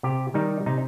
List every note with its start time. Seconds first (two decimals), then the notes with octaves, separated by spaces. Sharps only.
0.03 C3 G4
0.34 D#3 G3 D#4
0.66 C3 D#4